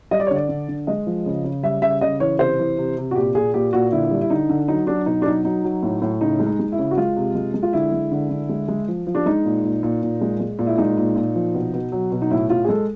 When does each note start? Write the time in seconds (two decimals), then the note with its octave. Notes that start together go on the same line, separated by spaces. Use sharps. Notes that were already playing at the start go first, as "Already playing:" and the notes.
0.11 G3 D#5
0.20 D5
0.27 C#5
0.31 D3 D5
0.49 D3
0.68 D3
0.87 G#3 D#5
1.07 F3
1.26 C#3
1.44 C#3
1.63 G3 E5
1.82 C#3 E5
2.01 C#3 D#5
2.20 E3 C#5
2.39 C3 C5
2.59 E3
2.78 C3
2.97 C3
3.11 F#4
3.16 A#2 G4
3.35 A#2 G#4
3.54 A#2 G4
3.73 A#2 F#4
3.92 D3 E4
4.11 G3
4.21 E4
4.30 D3 D#4
4.49 D3
4.68 F#3 D#4
4.87 F#3 D4
5.06 B2 D#4
5.22 D4
5.25 F#3 D#4
5.45 F#3 D#4
5.64 F#3
5.83 A2
6.02 A2
6.21 C#3 D#4
6.39 G#3
6.46 D#4
6.59 G#3
6.72 E4
6.79 C#3
6.91 F#4
6.97 G#3 F4
7.16 C3
7.35 G#3
7.54 G#3
7.63 F4
7.73 D3 E4
7.92 G#3
8.12 D3
8.30 D3
8.49 G#3
8.68 G#3
8.88 F3
9.07 F3
9.15 D4
9.26 G#3 D#4
9.45 A#2
9.64 A#2
9.83 A#2
10.03 A#2
10.21 G#3
10.40 G#3
10.59 A#2
10.67 E4
10.78 G#3 D#4
10.97 A#2
11.16 A#2
11.35 F3
11.54 B2
11.74 B2
11.92 F#3
12.12 B2
12.22 D#4
12.31 A2 E4
12.50 A2 F4
12.64 G#4
12.69 G#3 A4